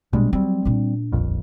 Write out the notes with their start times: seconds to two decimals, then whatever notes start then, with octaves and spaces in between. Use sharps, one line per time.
0.13 A#1 B2 G3 G#3
0.33 F#3 G3 C4
0.65 A#2 D4
1.12 D#1 A#1 F2